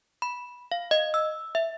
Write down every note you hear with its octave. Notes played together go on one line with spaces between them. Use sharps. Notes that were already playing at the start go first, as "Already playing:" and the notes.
B5
F5
D#5
E6
E5